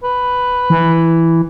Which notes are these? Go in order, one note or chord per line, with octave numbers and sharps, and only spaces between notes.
B4
E3